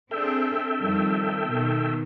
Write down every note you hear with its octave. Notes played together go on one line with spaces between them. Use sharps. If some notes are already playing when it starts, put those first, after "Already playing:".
C4 D4 G#4 A4 E5 G5
F2 D#3 G3
B2 D#3